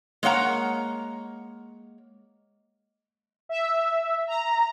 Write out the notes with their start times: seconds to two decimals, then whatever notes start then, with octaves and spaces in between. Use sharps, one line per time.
0.23 G#3 A#3 C#5 F#5 A#5
3.49 E5
4.27 A#5